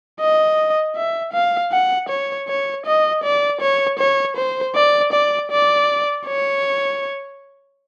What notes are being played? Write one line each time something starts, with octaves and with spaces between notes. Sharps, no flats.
D#5
E5
F5
F#5
C#5
C#5
D#5
D5
C#5
C#5
C5
D5
D5
D5
C#5